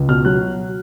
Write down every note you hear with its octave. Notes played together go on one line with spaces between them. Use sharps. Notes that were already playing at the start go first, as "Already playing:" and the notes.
Already playing: C#2
B2 F6
F#3 F#6